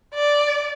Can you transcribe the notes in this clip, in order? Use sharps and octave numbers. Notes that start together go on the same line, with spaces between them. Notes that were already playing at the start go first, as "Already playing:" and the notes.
D5